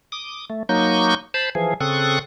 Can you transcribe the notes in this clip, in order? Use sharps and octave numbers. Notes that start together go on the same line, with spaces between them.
D6 D#6
A3
F#3 A#3 D#4 C#6 G6
C5 A5 B5
E3 F3 G#4
C#3 C4 A4 C#6 D#6 F#6